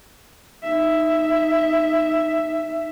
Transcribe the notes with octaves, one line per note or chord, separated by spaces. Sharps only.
D#4 E5